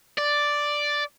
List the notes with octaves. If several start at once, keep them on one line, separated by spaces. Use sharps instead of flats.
D5